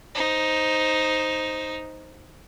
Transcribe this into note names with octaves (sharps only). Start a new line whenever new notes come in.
D#4 C5